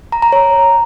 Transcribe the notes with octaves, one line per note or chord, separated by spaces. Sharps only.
A#5
A#5
C#5